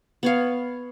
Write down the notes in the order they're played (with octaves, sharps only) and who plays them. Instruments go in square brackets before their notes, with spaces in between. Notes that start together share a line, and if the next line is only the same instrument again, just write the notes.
[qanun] B3 C#5 F5